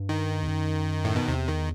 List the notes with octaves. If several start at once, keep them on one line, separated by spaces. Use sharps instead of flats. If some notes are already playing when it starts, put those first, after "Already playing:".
Already playing: G2
D#3
E2
F#2
A2
B2
E2 C3
D#3